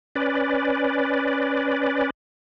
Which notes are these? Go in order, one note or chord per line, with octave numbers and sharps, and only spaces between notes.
C#4 B4 D5